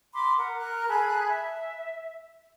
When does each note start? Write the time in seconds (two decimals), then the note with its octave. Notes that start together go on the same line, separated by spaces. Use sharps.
0.14 B5 C6 D6
0.37 A#4 F#5
0.58 A#4 F#6
0.88 G#4 A4 B5 F#6
1.29 E5